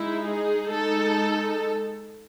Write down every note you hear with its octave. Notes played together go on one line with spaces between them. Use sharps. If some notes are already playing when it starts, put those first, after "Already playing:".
Already playing: G#3 D#4 E4
G#4
G#3 D#4 A4